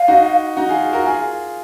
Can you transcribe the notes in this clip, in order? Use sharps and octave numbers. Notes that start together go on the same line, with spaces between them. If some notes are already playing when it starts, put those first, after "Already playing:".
Already playing: F5
D#4 F#4
D#4 F#4
F4 G#4
F#4 A#4
F4 G#4